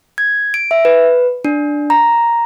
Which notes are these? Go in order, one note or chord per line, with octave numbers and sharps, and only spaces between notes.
G#6
D7
E5
B4
D4
A#5